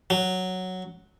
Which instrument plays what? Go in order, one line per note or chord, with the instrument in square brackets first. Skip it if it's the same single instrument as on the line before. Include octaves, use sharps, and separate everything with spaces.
[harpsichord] F#3